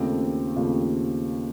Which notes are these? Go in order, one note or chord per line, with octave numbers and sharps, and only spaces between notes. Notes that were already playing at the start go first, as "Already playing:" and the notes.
Already playing: D#2 C#3 F3 A3 C4
D#2 C#3 F3 A3 C4